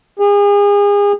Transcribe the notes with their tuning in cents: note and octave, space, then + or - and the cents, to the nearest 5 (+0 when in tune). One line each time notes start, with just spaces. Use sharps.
G#4 -35